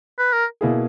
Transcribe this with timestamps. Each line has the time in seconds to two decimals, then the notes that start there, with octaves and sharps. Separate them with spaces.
0.19 B4
0.33 A#4
0.61 B2 A#3 E4 G#4